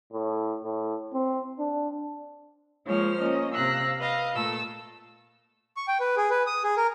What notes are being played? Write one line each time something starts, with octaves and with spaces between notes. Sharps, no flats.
A2
A2
C4
D4
F3 G#3 A#3 C5 C#5 F6
A#3 C#4 D#5
C3 F5 E6 F#6 A#6
B4 D#5 F5
A#2 A3 A4 E6
C#6
G5
B4
G#4
B4
D#6
G#4
A#4